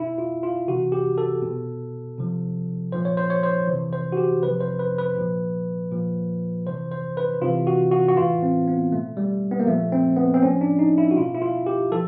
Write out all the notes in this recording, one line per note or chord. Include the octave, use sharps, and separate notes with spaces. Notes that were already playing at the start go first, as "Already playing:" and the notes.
Already playing: B2 E4
F4
F4
C3 E3 F#4
G4
A4
B2
C3 F3
A#2 F3 C5
C#5
C5
C#5
C5
C3 E3
C5
F#4
G4
C3 F3 B4
C5
B4
B4
A#2 F3
A#2 F3
C3 E3 C5
C5
B4
C3 E3 F4
F#4
F#4
F#4
A2 E3 F4
C4
B3
B2 A3
G3
B3
A#3
A#2 F3 A3
C4
B3
C4
A2 F3 C#4
D4
D#4
E4
F#4
B2 F4
E4
F4
G4
F3 A4